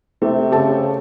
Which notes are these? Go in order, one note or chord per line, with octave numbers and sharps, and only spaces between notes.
C3 A3
C#3 G4 A4 A5